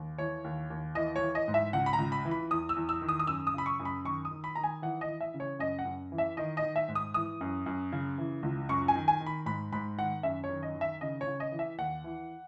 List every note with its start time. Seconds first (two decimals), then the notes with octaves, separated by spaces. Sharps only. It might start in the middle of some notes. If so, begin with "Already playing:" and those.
Already playing: D#2
0.18 E3 C#5
0.44 D#2
0.70 D#2
0.95 E3 D#5
1.16 C#5
1.21 E3
1.35 D#5
1.48 G#2
1.54 E5
1.73 C#2 F#5
1.86 B5
1.93 A#5
1.98 C#2
2.12 B5
2.25 E3
2.31 B5
2.51 E2 D#6
2.69 E6
2.76 E2
2.89 E6
3.02 D#3
3.09 D#6
3.20 D#6
3.27 F#2 E6
3.47 D#6
3.54 C#3 B5
3.66 C#6
3.80 F#2
3.85 B5
4.05 D#3 C#6
4.25 D#6
4.31 D#3
4.44 B5
4.55 D#3 A#5
4.64 G#5
4.82 E3 F#5
5.01 D#5
5.09 E3
5.21 E5
5.34 C#3
5.40 C#5
5.59 F#2 D#5
5.79 F#5
5.85 F#2
6.12 E3
6.18 E5
6.37 D#3 D#5
6.57 D#5
6.62 D#3
6.76 E5
6.88 G#2
6.95 D#6
7.14 E3 D#6
7.41 F#2
7.66 F#2
7.92 C#3
8.18 E3
8.43 C#2
8.69 F#2 C#6
8.88 G#5
8.95 D#3
9.08 G#5
9.20 D#3
9.26 B5
9.46 G#2 B5
9.72 G#2 B5
9.98 D#3 F#5
10.23 F#2 E5
10.44 C#5
10.49 D#3
10.63 D#5
10.75 D#3
10.81 E5
11.01 C#3 D#5
11.21 C#5
11.27 C#3
11.40 D#5
11.52 E3
11.59 E5
11.78 D#2 F#5
12.04 E3